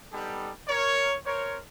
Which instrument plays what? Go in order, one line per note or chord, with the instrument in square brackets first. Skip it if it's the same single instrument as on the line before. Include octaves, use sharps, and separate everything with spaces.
[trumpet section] G3 B3 D#4 G4 A4
A#4 C#5
A#4 C5 C#5